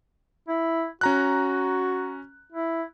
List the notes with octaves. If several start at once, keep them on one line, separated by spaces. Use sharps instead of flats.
E4
C#4 F#4 A#5 F#6
E4